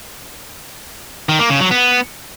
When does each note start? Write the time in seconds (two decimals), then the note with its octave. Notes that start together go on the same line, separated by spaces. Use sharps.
1.29 D#3
1.39 A#3
1.50 C#3
1.60 F#3
1.71 B3